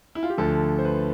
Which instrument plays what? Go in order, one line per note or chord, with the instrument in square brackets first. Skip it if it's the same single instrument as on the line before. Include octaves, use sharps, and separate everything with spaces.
[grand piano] E4
F4
G4
D2 D3 F3 A4
C5
B4